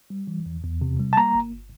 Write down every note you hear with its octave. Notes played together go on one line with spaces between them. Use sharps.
G3
E3
E2
E2
C3
G3
A5
A#3 A#5
G1